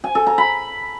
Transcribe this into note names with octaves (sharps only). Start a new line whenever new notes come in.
G#5
A4
A#5
B5